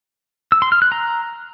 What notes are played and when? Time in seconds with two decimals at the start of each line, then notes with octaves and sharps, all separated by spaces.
0.52 E6
0.62 C6
0.72 F6
0.82 F#6
0.92 A#5